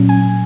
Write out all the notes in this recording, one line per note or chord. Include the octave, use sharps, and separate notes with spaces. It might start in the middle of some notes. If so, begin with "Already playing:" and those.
Already playing: A#2 F#3 C#4
G#5